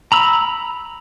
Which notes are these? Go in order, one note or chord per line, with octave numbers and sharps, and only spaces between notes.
A#5 B5 E6